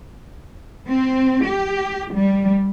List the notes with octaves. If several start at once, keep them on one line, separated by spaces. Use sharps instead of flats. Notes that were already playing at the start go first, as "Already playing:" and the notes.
C4
G4
G3